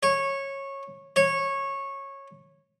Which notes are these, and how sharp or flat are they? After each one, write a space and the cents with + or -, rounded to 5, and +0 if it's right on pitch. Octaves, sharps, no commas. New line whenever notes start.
C#5 -15
C#5 -15